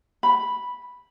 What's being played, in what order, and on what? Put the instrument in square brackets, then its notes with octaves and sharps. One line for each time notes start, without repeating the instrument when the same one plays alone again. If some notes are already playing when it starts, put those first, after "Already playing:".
[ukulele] B5